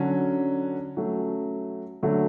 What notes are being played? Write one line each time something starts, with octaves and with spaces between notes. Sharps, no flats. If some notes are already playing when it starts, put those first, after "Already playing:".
Already playing: D3 F#3 C#4
F#3 A3 C#4
D3 F#3 A3